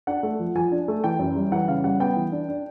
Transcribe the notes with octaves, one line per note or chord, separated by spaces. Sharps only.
D4 F#5
A3
F3
F3 G#5
D4
A3
E3 G5
F#2
G3
E3 F#5
C#3 F5
G3 F#5
B3 G5
E3
D4
D4